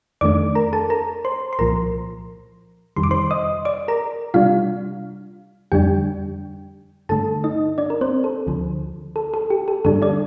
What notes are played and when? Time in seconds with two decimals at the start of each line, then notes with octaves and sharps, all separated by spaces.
0.21 F2 D#3 A3 D4 D5 D6
0.55 A#4 A#5
0.73 A4 A5
0.90 A#4 A#5
1.25 C5 C6
1.53 C6
1.59 C2 A#2 F3 A#4 A#5
2.96 F2 C3 D#3 G3 C6
3.03 D6
3.11 C5 C6
3.31 D#5 D#6
3.65 D5 D6
3.88 A#4 A#5
4.34 C3 G3 D4 F4 F5
5.72 F2 D3 G3 D4 G4 G5
7.09 G2 D3 A3 A4 A5
7.44 D#4 D#5
7.78 D4 D5
7.90 A#4
8.01 C4 C5
8.24 A4
8.47 D2 D3 F3
9.16 A4
9.34 A4
9.50 G4
9.68 A4
9.85 G2 D3 G3 D4 A4
10.02 D4 D5